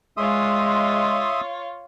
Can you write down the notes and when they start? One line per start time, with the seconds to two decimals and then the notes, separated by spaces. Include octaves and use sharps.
0.17 G#3 F4 C#5 E5 C6 D#6